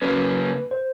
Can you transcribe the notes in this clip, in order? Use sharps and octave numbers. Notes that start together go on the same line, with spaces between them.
C#3 F#3 A#3 C#4 B4
C5